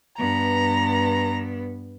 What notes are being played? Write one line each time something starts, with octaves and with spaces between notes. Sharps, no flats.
G2 B3 A#5